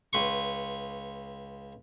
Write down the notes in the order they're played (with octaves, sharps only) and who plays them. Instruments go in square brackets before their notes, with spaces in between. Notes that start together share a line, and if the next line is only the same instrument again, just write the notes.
[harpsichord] C#2 B4 C6 C#6